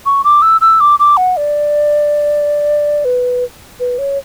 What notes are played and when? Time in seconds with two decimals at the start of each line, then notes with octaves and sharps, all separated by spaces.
0.06 C#6
0.24 D6
0.42 E6
0.61 E6
0.81 D6
0.99 D6
1.17 F#5
1.37 D5
3.05 B4
3.80 B4
3.98 C#5